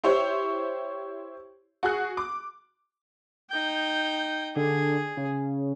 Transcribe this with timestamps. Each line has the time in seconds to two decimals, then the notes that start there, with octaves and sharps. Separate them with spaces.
0.04 E4 G4 C5 C#5
1.83 F#4 G#4 F#6
2.17 D6
3.51 D#4 G5 G6
4.56 D3 G#4
5.17 C#3